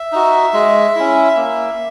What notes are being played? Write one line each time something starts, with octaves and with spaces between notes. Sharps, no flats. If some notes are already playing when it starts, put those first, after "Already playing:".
Already playing: E5
D#4 F#4
G#3
C#4 E4
A#3